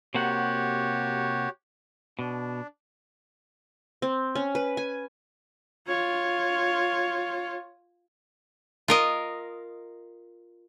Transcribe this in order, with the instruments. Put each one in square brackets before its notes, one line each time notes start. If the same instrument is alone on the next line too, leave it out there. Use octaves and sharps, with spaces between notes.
[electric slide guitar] C3 A#3 F#5 [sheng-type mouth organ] F#4 G4 C#5
[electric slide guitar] B2 [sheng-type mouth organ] D4
[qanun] C4
C#4
B4
G#5
[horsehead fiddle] F4 C#5
[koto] F4 A#4 D#5